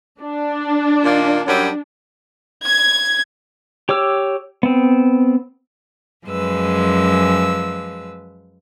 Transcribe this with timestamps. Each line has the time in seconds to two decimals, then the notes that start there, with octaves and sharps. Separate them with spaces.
0.21 D4
1.04 A#2 D#3 A#3
1.47 F#2 F#3 G3
2.64 G#6
3.89 G4 C#5 D6 E6
4.63 B3 C4
6.25 F#2 F3 G#3 B4 E6